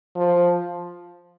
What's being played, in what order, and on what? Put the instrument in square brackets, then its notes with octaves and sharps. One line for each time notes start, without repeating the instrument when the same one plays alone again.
[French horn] F3